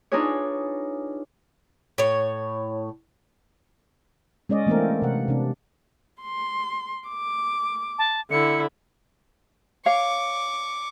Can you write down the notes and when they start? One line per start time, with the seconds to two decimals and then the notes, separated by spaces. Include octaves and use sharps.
0.12 D4 D#4 F4 G#4 B4 C#5
1.98 A2 C#5
4.49 G#3 C#4 D5 D#5
4.67 E3 A3 A#3 C4 D4 A#4
5.02 C3 F#5
5.28 C3 D4
6.22 C6
7.09 D6
7.98 A5
8.31 D3 E4 C#7
9.86 C#5 F5 C#6 D6